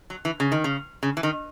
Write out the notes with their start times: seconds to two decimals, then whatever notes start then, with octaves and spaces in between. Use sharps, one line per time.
0.10 F#3
0.25 E3
0.40 C#3
0.52 D#3
0.64 C#3
1.03 C#3
1.17 E3
1.23 D#3